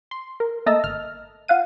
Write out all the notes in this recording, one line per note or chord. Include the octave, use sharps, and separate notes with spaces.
C6
A#4
A3 A#3 D#5 A5 A#5 E6
G#1 F6
F4 F5 F#5 D#7